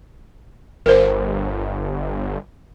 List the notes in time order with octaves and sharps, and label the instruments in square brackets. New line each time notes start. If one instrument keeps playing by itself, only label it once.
[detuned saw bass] G1 [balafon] A#4 C5